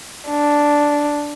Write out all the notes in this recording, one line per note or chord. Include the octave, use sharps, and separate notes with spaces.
D4